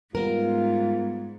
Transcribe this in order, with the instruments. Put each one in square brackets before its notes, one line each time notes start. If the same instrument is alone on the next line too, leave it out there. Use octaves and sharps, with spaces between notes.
[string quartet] G#2 [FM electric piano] G3 B3 [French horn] F4 [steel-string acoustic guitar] A#4